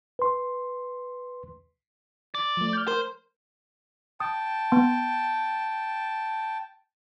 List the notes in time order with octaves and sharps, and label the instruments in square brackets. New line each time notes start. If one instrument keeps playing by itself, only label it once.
[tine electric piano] B4 C6
[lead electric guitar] D5
[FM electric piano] F3 A3
F6 G6
[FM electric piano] A#4 [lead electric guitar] C5
[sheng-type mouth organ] G5 A5 [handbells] D#6
[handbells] B3 C6